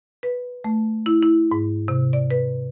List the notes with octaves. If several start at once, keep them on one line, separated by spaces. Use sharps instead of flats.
B4
A3
E4
E4
G#2
C3
D5
B4